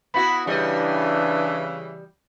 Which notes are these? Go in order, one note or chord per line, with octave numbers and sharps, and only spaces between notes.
B3 E4 F#4 B5
C#3 E3 G3 D4 D#5